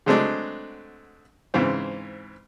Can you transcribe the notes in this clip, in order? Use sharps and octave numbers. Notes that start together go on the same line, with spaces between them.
D3 F#3 G#3 A3 C4 D4
G#2 C#3 E3 C4